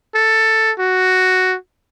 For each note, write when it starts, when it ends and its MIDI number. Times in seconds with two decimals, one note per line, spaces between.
0.15 0.71 69
0.79 1.56 66